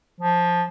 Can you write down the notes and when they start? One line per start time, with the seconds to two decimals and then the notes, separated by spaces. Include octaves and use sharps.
0.20 F3